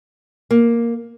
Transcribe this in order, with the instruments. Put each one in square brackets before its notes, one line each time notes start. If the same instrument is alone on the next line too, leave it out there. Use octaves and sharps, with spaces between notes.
[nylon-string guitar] A#3